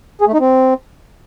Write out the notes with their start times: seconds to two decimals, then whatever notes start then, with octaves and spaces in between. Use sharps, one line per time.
0.21 G#4
0.27 A3
0.34 D#4
0.40 C4